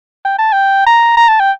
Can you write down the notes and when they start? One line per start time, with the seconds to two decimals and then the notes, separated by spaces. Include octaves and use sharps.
0.25 G5
0.39 A5
0.52 G5
0.87 A#5
1.17 A#5
1.29 A5
1.40 G5